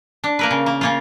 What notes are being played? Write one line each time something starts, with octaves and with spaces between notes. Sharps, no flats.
D4
A#3 A#4 B4
C#3
A#3
C#3 A#3 F4